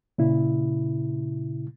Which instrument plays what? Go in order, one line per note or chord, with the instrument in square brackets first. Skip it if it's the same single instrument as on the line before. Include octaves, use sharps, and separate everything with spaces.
[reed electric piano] A#2 C#3 E4